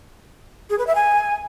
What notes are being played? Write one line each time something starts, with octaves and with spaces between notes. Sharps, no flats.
G#4
B4
E5
G#5